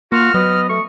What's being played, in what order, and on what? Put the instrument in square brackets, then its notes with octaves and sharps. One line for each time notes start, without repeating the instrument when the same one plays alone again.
[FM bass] A#3 [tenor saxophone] F4 [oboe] F#4 [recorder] F6
[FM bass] F#3 [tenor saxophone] B3 [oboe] D#5
[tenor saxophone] A3 [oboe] C#6